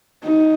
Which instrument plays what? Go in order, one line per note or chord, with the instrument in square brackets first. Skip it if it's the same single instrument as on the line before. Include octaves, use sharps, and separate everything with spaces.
[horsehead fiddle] D#4